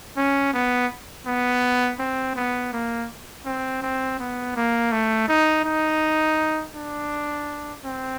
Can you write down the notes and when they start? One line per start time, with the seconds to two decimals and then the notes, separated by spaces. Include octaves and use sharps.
0.17 C#4
0.53 B3
1.27 B3
1.99 C4
2.36 B3
2.73 A#3
3.45 C4
3.82 C4
4.19 B3
4.56 A#3
4.92 A3
5.28 D#4
5.65 D#4
6.74 D4
7.84 C4